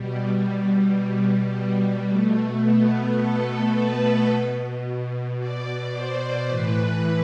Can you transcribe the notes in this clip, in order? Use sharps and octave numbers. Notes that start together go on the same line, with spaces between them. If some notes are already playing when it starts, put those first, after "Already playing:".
Already playing: B2 G3
G3
B2 A3
B3
A4
B4
B2
D5
C5
A2 E3 B4